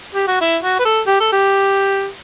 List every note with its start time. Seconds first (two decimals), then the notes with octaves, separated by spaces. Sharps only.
0.15 G4
0.27 F#4
0.41 E4
0.63 F#4
0.79 B4
0.85 A4
1.07 G4
1.20 A4
1.32 G4